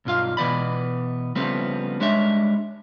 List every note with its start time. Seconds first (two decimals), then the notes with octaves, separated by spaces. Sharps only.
0.05 B1 G2 F4 F5
0.37 B2 E3 B3 D5 B5
1.35 C#3 F3 G3 A3 B3 C4
2.00 G3 G#3 D4 C#5 E5